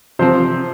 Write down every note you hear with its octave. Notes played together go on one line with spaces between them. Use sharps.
C3 F3 C4 C5